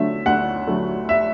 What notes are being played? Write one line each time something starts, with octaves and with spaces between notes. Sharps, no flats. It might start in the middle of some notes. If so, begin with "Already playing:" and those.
Already playing: D3 F#3 A3 E5
D2 F#5
D3 F#3 A3
E5